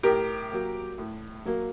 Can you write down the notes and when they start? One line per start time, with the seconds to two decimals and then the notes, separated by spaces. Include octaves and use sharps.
0.03 A2 G4 A#4
0.51 F#3 A#3
0.98 A2
1.45 F#3 A#3